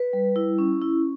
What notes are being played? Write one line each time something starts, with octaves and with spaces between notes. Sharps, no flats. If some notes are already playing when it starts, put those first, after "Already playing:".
Already playing: B4
G3
E4
C#4
E4